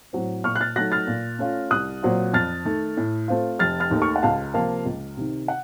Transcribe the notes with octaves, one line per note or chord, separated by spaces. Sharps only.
A2 F#3 C4
A#2 C#6 F6
F#6
F6 A6
F#3 A3 D#4 F#6 A#6
F6 A6
A#2
A3 C#4 F4
C2 D#6 F#6
A#2 F#3 C4 F4
F2 F6 A6
D#3 A3
A2
A3 C4 F4
F1 F6 A6
F6 A6
D#2 D#3 A3 D#4
C#6 F6
F#5
C#2 F5 A5
C3 F3 A#3 F4 F5 A5
C#2
C3 D#3
F#5